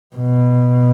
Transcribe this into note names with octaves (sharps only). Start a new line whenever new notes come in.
B2